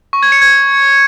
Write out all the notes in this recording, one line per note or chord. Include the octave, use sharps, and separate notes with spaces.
C#6
G#6
C#7
G#6